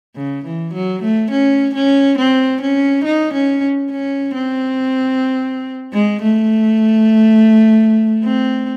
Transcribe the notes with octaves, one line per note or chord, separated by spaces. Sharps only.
C#3
E3
F#3
A3
C#4
C#4
C4
C#4
D#4
C#4
C#4
C4
G#3
A3
C4